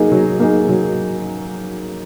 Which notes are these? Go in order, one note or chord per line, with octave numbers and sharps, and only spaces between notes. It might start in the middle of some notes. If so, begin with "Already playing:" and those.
Already playing: F#3 A#3 D#4 G#4
F#3
A#3 D#4 G#4
F#3